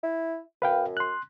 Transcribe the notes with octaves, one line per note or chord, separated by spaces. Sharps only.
E4
F#2 B4 F5 G5
C6 F#6